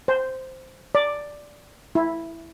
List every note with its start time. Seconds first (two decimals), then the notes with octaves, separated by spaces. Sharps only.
0.08 C5
0.95 D5
1.95 E4